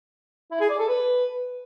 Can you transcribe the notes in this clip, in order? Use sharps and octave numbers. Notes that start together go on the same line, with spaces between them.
E4
G#4
D5
A4
B4